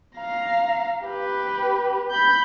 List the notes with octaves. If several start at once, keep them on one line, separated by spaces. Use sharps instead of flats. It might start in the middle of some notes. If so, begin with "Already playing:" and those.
F5 A#5
G4 B4
B5 G6